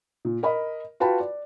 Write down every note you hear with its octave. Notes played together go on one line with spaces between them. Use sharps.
A#2
A#4 D#5 B5
F4 F#4 B4 G5 A5 B5
D5